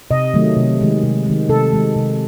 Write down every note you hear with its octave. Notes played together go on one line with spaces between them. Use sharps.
C3 D#5
D#3 F#3 A3
C3
D#3 G#3
C3
D#3 G#3
C3 A4
D#3 G#3
C3